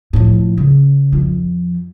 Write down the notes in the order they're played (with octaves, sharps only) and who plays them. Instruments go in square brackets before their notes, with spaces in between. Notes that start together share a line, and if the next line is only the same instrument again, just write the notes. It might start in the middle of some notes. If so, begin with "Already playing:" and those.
[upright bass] A2 F3
C#3
F2 F3